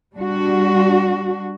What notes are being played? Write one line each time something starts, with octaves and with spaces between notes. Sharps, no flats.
G3 D4 F#4